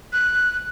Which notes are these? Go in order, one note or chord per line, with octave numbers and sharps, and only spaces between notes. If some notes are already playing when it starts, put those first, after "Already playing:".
F#6